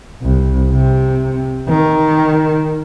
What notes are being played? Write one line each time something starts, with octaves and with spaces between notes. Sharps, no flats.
C2
C3
D#3